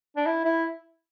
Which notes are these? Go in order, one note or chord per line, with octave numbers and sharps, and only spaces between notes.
D4
E4
E4